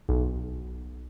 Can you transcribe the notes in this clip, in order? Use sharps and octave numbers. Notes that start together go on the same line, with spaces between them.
B1